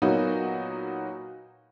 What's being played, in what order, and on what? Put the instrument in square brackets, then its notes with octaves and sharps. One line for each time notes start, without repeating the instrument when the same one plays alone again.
[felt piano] A#2 F#3 A#3 B3 D#4 F#4